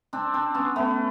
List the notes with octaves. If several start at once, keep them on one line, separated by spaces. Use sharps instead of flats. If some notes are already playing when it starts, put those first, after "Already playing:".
C4 D4
C4 D4
B3 C#4
A3 B3